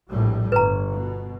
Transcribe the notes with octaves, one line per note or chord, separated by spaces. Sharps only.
A#1 A2 G3
G1 B4 A#5
B2